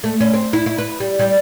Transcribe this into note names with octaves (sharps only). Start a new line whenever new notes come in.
A3
C#4
C4
E4
E4
B4
G3
G3